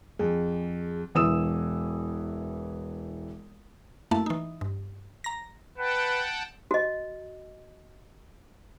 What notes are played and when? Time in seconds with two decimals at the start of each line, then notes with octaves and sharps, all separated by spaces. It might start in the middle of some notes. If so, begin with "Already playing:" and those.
0.19 F2 G#4
1.15 E1 E3 D#6 E6 E7
4.11 F#2 A3 A#3 E4 A5
4.26 E3 D#4
4.61 G2
5.24 A#5 A#6
5.78 B4 F#5 G5 A5
6.71 F#4 D#5